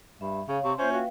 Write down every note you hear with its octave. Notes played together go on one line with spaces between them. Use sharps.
G2 E5 B5
C#3 C#5 F5
C3 C6 C#6
A#3 C#4 F4 C5 E5
F#4 B4 F5 G5